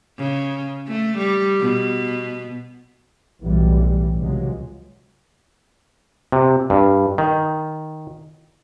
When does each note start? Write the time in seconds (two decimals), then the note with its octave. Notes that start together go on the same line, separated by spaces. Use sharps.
0.18 C#3
0.87 A3
1.17 G3
1.60 B2
3.42 B1 A2 E3 G3
4.19 C#2 C3 F3 F#3 G#3
6.32 C3
6.70 G2
7.18 D#3